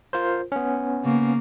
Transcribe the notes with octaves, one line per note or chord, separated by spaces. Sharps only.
F4 A#4 C5
B3 C#4
C#3 A#3